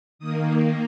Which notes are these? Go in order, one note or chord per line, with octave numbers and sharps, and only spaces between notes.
D#3 A#3 D#6